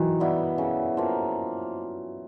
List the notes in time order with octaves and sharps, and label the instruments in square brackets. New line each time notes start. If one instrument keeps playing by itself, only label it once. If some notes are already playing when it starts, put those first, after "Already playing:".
Already playing: [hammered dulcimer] D#3 [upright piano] E3 F#3
[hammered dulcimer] G3 B3 E4
C#3
F3 A#3